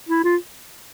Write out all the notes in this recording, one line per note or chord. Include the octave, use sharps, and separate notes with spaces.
E4
F4